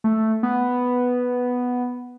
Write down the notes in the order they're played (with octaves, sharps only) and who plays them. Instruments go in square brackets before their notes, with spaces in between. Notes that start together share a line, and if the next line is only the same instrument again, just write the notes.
[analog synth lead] A3
B3